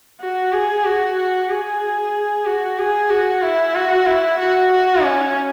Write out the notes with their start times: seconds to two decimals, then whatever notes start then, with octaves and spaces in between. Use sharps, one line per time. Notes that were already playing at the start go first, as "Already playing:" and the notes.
0.21 F#4
0.52 G#4
0.84 F#4
1.17 F#4
1.50 G#4
2.46 F#4
2.79 G#4
3.10 F#4
3.43 E4
3.75 F#4
4.07 E4
4.39 F#4
4.71 F#4
5.03 C#4